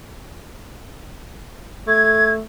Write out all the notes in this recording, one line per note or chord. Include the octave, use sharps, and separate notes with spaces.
A3 G#6